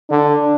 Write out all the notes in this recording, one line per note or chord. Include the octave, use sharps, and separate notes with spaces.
D3 D4